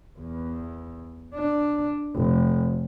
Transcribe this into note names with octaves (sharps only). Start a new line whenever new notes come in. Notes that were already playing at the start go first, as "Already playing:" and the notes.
E2
D4
F1